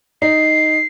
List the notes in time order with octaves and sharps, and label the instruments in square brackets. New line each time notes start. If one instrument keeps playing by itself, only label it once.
[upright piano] D#4 [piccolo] C7